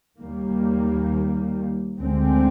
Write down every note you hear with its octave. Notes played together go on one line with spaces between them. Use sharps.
D#2 D#3 G3 A#3
D2 D3 G#3 C4